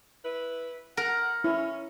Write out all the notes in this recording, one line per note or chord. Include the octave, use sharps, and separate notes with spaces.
E4 B4
A#4 F#5
C#4 E4